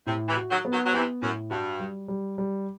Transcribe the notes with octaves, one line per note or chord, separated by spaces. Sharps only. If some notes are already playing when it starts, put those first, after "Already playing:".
A2 C3
C3 E3
F#4
D#3 F#3
B3
D#3 F#3
F#3
C3 E3 B3
F#2 A2
G2 F#4
G3
G3
G3